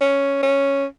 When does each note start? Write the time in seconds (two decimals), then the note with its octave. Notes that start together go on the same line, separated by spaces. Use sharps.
0.01 C#4
0.43 C#4